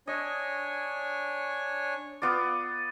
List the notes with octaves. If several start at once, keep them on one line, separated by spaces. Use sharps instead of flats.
D4 C#5 D#5 G#5
B3 F4 D5